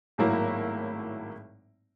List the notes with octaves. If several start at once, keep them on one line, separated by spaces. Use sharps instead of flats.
G#1 A2 F#3 A#3 E4 A#5